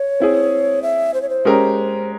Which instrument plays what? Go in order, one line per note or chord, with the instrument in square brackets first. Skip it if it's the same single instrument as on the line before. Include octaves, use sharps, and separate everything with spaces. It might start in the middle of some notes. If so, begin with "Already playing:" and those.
Already playing: [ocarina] C#5
[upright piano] C4 E4 G#4
[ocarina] E5
C5
C#5
C5
[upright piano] G#3 C#4 G4 A#4